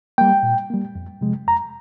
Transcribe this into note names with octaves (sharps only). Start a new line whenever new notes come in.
G3 A#3 G5
A#2
G3 A#3
F2
C3 F3 G#3
F2 A#5